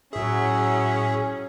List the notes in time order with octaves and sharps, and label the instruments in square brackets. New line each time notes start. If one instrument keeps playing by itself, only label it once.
[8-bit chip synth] A2 G#4 [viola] F#3 E5 [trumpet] C#4